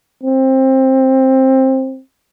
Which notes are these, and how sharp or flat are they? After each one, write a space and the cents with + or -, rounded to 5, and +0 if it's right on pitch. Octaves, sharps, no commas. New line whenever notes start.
C4 +15